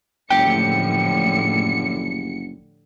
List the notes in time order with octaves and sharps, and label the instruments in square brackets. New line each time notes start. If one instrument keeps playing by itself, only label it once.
[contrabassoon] F#1 [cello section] A2 D3 F3 [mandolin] G4 [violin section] C#7